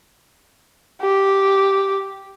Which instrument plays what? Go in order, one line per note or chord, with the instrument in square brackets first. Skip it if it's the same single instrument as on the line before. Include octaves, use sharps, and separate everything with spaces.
[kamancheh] G4